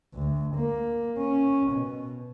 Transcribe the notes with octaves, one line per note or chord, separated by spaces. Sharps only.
D2
A#3
C#4
B2